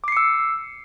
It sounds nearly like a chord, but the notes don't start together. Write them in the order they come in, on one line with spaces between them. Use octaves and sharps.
D6 C7 C#7 E6